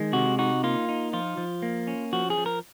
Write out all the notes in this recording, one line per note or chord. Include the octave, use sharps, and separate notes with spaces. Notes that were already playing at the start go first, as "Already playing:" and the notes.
Already playing: D#3 G#3
C3 F#4
D#4 F#4
A#3 F4
D#4
F3 F4
F3
A#3
C#4
F3 F#4
G#4
F3
A#4